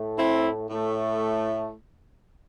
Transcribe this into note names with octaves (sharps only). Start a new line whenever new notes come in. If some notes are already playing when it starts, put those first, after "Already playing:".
Already playing: A2 A3
C4 E4
A2 A3